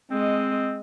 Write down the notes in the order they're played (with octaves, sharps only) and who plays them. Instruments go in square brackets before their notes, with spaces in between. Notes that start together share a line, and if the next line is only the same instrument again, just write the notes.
[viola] G#3 D#5 [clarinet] C4